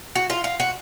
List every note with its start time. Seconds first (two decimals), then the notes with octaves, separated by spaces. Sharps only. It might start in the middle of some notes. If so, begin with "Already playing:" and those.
0.15 F#4
0.30 F4
0.44 F4
0.60 F#4